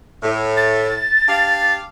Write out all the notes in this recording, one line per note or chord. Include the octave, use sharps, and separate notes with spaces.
A2
A6
D4 G4 F5